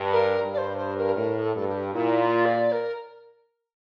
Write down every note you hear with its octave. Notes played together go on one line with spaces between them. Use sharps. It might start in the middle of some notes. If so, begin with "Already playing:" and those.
Already playing: G2
A#4
G2
D5
C5
C5
A#4
A2 A#4
A#4
A4
G2 A4
G4
A#2 E4
F4
D5
A#4